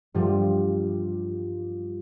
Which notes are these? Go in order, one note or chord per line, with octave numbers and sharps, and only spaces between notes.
G2 F3 G3